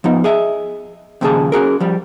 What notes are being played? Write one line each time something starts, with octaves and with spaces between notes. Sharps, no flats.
F3 B3 D#4
G#4 D#5 E5
D#2 A#2 C#3 F3 G#4 A5
C#4 F#4 G#4 A#4
F3 G3